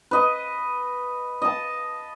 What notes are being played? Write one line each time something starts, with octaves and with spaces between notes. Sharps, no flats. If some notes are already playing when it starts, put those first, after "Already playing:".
B4 D#5
D#5 A5